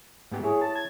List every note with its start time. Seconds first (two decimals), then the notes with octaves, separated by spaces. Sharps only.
0.31 G#2 B3 G4
0.43 E4 G#4 C#5
0.62 A5
0.75 G#6